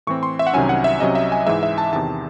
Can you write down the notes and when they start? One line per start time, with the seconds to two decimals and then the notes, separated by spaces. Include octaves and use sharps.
0.07 A2 E3 C4 C#6
0.23 C6
0.39 E5
0.47 F#5
0.54 C2 C3 D#3 F#3 C#4 G#5
0.69 F#5
0.84 E5
1.00 C2 C3 F#3 C#4 D#5
1.15 E5
1.32 G#5
1.47 G#2 E3 G#3 E5
1.63 E5
1.78 A5
1.93 E2 C3 D#3 A5